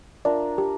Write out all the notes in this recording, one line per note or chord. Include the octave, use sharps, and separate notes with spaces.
D4 F4 A#4 D5 E5
G4